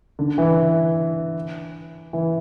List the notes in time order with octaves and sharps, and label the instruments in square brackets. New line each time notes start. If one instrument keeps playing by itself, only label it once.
[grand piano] D3
E3
E3